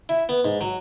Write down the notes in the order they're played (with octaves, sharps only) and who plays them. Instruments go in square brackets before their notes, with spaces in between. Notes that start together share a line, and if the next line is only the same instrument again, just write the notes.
[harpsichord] E4
B3
G#2
F#3